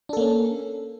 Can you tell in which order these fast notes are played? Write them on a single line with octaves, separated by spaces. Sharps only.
D4 A4 A#3 C#4